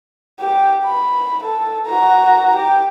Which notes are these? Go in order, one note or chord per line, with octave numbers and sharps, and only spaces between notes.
G4
B5
A4
F#4 A#5
G4